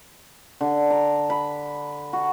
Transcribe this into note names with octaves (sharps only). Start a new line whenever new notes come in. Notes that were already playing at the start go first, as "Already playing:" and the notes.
D3
A#5
B5
F#4